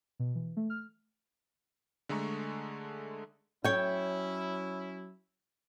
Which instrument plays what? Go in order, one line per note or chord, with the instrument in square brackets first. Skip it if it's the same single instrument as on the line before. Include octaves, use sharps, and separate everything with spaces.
[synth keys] B2
E3
A3
F6
[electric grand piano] D3 G#3 A3 A#5 C#6
[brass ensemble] F#3 C#4 E4 [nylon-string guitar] C#5 G5